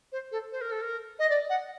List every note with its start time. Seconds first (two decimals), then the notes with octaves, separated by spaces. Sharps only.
0.12 C5
0.31 A4
0.52 C5
0.61 A#4
0.71 A4
0.81 A#4
1.19 D#5
1.29 D5
1.49 F#5